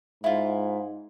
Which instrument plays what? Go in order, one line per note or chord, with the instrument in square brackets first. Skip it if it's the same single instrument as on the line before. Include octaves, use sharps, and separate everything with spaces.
[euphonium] G#2 [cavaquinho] E4 F4